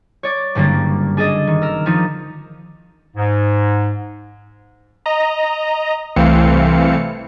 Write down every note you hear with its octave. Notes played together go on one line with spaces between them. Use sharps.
C#5 D5 D6
F#1 G2 D3 A#3 D5
D4 G#4 A4 D5 D#5
D#3
A#4 E6
D#3 F3 D4 D#4
G#2
D#5 A#5
C2 E3 A3 C4 F5 C#7